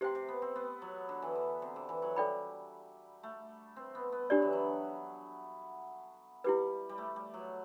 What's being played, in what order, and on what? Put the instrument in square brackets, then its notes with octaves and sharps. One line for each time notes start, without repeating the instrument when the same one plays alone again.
[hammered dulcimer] C3 [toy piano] G4 C5 G5 C6
[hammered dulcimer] C3
B3
C4
B3
F#3
D3
E3
D3
C3
D3
E3
F#3
[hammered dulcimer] G3 [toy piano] A4 D5 G5 B5
[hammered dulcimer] A3
C4
B3
B3
[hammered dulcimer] F#3 [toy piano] D4 G4 D5
[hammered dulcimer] E3
F#3
[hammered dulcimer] G3 [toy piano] E4 G4 B4
[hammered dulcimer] G3
A3
G3
F#3